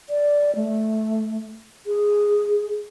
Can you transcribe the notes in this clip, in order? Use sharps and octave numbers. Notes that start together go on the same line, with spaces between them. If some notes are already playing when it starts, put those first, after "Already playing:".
D5
A3
G#4